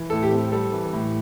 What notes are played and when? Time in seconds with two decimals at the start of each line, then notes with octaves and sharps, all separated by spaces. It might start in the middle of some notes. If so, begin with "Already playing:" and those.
Already playing: E3
0.10 A2 A4
0.23 G4
0.32 C4
0.52 G3 A4
0.73 E3
0.93 A2